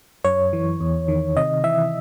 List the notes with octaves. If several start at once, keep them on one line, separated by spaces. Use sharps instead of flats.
F#2 C#5
E3
E2
D#3
C3 D#5
E3 E5